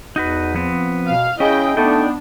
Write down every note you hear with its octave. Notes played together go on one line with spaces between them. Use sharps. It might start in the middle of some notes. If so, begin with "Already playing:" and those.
E2 D#4 F#4 B4
F3 B3 C4
B2 F5
C#3 C#4 E4 G#4 D#5 G5
A3 B3 D4 D#4 G5